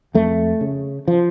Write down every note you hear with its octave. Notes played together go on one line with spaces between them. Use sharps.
F2 A3
C#3
F3